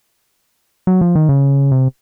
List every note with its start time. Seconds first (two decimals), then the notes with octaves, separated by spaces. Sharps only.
0.87 F#3
1.01 F3
1.15 D#3
1.29 C#3
1.72 C3